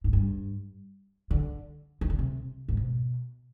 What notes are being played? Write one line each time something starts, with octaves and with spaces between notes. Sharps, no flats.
G#2
G2
D3
D#3
D3
C3
G#2
B2